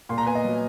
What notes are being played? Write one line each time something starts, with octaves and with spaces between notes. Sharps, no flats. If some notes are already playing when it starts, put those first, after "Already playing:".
A#2 C6
A#5
B3 G#5
D#5
F#3